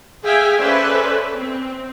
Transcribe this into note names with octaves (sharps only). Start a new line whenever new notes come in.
G#4 E5 F5 G5 G#5
C#4 A4 B4 C5 D5 E5
C4